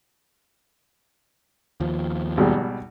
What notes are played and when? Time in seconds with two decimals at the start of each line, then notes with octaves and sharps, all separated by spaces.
1.80 D#2 F3
2.37 G#1 B2 G3